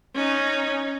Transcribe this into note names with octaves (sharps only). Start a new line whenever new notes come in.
C#4 D#4